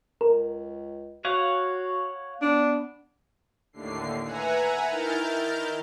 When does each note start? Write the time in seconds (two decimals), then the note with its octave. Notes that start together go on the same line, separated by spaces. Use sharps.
0.21 C#2 A#4
1.25 F#4 C#5 F5 F#5
2.41 B3 D4
3.73 D#2 A2 D3 C7
4.25 B4 E5 F#5 G#5 A#5
4.88 D#3 E4 A#4 F6 G6 A6